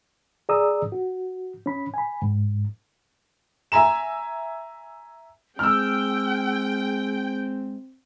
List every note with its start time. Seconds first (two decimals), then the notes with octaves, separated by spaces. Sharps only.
0.49 G#4 D5 A#5 D#6 E6
0.92 F#4
1.66 C#4 B5
1.94 G#5 B5
2.22 G#2
3.72 E5 G#5 A#5 E7
5.59 G#3 C4 G5 E6 F6